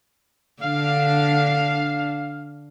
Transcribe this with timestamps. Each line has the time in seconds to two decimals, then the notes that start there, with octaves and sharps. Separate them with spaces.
0.62 D3 D4 F5